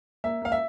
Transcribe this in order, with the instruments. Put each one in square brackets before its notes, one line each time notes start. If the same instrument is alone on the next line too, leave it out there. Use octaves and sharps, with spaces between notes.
[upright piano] A#3 E5
A#3 F5
E5